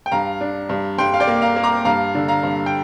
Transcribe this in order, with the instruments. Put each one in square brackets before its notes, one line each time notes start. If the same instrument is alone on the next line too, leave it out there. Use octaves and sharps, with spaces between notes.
[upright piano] G5
G2 F5 A#5
D4
G2
G2 G5 C6
F5
D5 G5
A#3
F5 A#5
A#3
A#5 D6
G2 F5 A#5
D3
F5 A#5
G2
G5